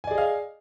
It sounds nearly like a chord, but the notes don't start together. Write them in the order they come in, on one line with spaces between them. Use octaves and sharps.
G#5 D5 G#4 D#5 F5